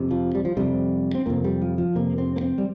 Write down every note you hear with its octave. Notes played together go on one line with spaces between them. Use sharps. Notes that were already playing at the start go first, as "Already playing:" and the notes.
Already playing: F2 C3
F3
G3
F3
F2 C3 G3
C4
F2 C3 A#3
G3
F3
F3
F2 C3 A#3
C4
A#3
C4
G3